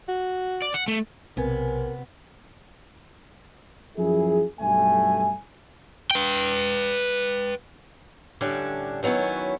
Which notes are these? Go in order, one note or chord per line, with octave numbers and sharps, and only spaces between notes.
F#4
D5
F#5
A3
B1 C3 B3 C4 A#4 G#5
F#2 F3 E4 G#4
B1 G2 A3 G#5
B4 G5
A2 D3 G3 C#4 D4
D#3 F#3 B3 C#4 E4